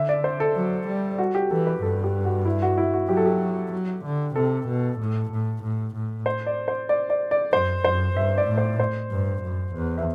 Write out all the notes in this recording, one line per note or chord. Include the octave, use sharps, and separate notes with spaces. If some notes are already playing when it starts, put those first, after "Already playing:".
Already playing: D3 E5
D5
C5
A4
F#3
G3
F#4
G4
E3 A4
B4
G2 A4
G4
F#4
E4
F#4
E4
F#4
F#3 G4
A4
G4
F#3
D3
C3 A4
B2
A2
A2
A2
A2
C5
D5
C5
D5
D5
D5
F#2 C5
F#2 C5
G2 E5
D5
A2
C5
C5
G2
F#2
E2
E5